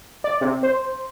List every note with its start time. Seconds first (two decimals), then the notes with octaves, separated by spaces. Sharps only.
0.24 D5
0.41 C3
0.63 C5